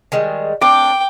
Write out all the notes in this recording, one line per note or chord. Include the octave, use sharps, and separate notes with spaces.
D#3 G3 G#3
A3 C4 D4 G5 D6